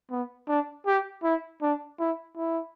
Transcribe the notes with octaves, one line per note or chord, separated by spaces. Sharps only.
B3
D4
G4
E4
D4
E4
E4